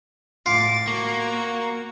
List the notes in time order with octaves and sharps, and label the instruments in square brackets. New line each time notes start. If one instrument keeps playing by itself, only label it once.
[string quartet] A2 D6 A6 [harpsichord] F4
[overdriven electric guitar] A#3 [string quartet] F#4 C#6